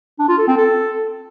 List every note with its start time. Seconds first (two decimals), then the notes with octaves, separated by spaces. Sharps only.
0.19 D4
0.29 F4
0.38 A4
0.48 C4
0.57 A4